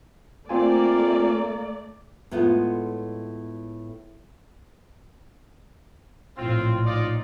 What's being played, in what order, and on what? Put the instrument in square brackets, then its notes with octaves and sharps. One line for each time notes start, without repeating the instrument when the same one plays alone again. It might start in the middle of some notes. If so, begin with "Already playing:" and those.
[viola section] A3 D5 [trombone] A#3 [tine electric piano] C4 F4 G#5
[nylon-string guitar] A2 G#3 A3 B3 F4
[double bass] A#1 A2 [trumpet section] C4 F4
[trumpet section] D#4 F4 D5